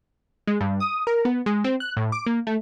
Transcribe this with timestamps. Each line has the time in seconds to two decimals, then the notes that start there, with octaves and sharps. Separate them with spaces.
0.47 G#3
0.61 G2
0.80 D#6
1.07 A#4
1.25 B3
1.46 G#3
1.64 C4
1.80 F#6
1.97 A2
2.12 D6
2.26 A#3
2.47 A3